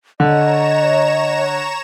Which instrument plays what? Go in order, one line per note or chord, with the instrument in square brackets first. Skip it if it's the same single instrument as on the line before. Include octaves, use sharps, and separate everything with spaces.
[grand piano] D3 [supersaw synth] C#5 A#5 E7 [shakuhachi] D#5